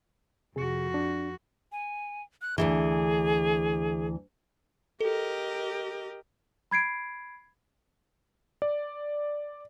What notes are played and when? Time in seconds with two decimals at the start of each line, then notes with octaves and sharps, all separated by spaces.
0.56 F2 C3 F#4 G#4
0.94 D4
1.72 G#5
2.42 F#6
2.58 D2 G#2 E3 G#4
5.01 G4 A4 A#4 D#5
6.71 B5 G#6 C7 D7
8.62 D5